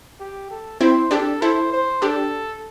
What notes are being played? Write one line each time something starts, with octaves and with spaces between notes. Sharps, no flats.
G4
A4
C4 E4 C5
D4 G4 A4
E4 A4 C5
C5
D4 G4 A4